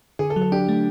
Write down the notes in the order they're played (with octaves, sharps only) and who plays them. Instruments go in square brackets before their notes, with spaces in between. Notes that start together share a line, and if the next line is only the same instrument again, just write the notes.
[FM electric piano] D3 [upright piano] G#4
[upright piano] A4
[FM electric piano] F#3
[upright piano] A4
[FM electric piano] D4 [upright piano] G4
[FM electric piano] A3